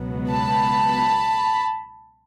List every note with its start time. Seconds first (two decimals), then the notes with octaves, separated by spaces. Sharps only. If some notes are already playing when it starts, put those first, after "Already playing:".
Already playing: C#2 B2 F#3 B3
0.30 A5 B5